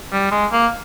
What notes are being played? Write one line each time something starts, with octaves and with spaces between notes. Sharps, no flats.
G3
G#3
A#3